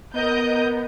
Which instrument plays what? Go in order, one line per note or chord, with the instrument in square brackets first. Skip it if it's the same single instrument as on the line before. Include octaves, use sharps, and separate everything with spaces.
[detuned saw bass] B3 [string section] A#4 D#5 G6